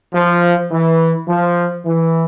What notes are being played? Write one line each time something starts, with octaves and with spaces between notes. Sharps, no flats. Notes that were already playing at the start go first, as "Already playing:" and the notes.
F3
E3
F3
E3